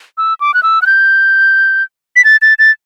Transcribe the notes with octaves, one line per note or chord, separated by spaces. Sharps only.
E6
D6
F#6
E6
F#6
G6
B6
A6
A6
A6